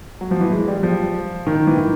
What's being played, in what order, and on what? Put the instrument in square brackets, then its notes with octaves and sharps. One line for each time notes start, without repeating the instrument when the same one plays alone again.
[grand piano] F#3
F3
E3
G#3
G3
F3
D#3
E3
D#3